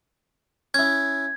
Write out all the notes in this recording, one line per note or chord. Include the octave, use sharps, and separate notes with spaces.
C#4 E4 G#6